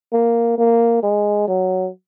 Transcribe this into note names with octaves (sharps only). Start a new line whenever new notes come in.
A#3
A#3
G#3
F#3